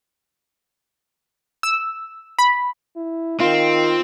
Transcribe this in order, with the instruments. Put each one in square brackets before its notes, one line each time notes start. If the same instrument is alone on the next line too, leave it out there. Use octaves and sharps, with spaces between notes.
[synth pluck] E6
B5
[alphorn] E4
[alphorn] D#3 [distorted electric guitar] C4 [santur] F4